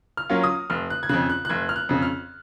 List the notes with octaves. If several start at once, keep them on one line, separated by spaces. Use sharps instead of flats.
F6
F#3 A#3 C#4 F4
D#6
F1 F6
F#6
G#6
F2 C#3 F#6
F#6
F#6
F1 G#6
F6
F#6
F2 C#3
F6